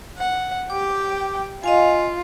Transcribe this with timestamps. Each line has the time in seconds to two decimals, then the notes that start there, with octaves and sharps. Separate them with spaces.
0.18 F#5
0.70 G4 G5 D6
1.64 F4 D#5 F5 G#5